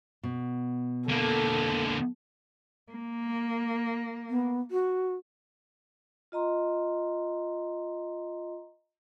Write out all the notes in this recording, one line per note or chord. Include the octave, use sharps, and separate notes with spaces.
B2
D3 A#3 A4
A#3
B3
F#4
F4 D#5 A#5 C6